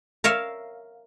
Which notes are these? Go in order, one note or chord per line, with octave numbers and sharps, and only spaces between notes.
A#4 C#5 E5 F5